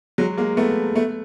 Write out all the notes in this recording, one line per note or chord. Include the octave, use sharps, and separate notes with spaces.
F#3 G#3
G#3 A#3
A3 B3
A3 B3